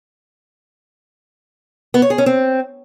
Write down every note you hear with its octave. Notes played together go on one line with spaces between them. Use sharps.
B3
C#5
G#4
C#4
C4